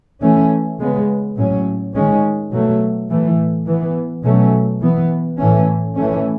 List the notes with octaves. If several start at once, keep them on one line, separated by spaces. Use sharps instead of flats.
E3 A3 C#4
C#3 G#3 B3
A2 F#3 C#4
D#3 G#3 C#4
B2 F#3 A3
A2 E3 A3
E3 B3
B2 F#3 A3 C#4
E3 B3
A2 E3 A3 C#4
E3 A3 C#4